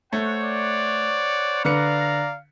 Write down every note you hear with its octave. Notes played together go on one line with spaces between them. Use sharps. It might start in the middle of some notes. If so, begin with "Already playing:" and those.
A3 C5 C#5 F#5
D5
D3 B4 D5 F5 A#5 C#7